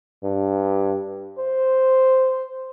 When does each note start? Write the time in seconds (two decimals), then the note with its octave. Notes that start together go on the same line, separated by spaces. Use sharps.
0.24 G2
1.39 C5